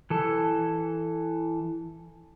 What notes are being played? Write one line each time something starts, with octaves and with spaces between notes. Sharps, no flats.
E3 A4